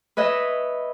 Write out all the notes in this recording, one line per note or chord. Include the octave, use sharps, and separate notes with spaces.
B4 C#5 D#5 E5